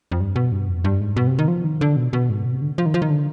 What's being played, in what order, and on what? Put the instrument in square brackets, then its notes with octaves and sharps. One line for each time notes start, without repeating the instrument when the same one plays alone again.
[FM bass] F2
G2
B2
G2
F2
G2
G#2
B2
C3
D#3
F3
D#3
D3
B2
B2
G#2
B2
C3
D3
F3
D#3
F3
D#3
D3